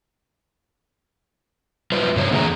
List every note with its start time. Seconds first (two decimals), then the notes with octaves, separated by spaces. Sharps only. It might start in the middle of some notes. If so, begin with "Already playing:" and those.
1.92 G3 F4 B4 C5
2.16 G2 C#3 C5 C#5
2.31 E2 D3 A#3 F4 G#4 A#5